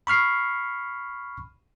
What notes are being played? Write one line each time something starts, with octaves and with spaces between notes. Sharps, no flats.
B5 C#6 F6 C7